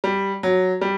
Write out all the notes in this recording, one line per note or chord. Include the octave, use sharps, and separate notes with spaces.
G3
F#3
G3